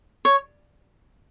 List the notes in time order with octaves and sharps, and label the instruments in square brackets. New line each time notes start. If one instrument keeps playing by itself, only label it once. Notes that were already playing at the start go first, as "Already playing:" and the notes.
[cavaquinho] C#5